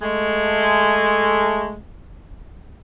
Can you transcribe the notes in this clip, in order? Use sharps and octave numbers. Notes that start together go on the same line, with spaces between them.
G#3 A3